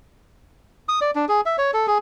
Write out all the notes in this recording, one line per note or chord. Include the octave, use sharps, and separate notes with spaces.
D#6
D5
D4
G#4
E5
C#5
A4
G#4